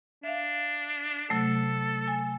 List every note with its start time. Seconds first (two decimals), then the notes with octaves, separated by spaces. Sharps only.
0.23 D4 E5 F5
1.30 C3 F#3 A3 A4
2.07 G#5